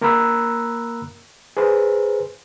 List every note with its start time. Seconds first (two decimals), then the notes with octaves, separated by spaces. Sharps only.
0.01 A#3 A#4 A#5 B5 E6 F#6
1.57 G#4 B4 C5